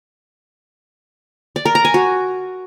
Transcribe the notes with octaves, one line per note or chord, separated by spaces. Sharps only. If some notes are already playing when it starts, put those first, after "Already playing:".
D5
A#4
A#5
G#5
F#4